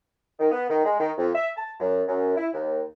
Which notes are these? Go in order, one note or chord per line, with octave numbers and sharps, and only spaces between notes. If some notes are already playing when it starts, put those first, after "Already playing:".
D#3
B3
D#3
G#3
D#3
F2
E5
A5
F#2
F#2
E4
D#2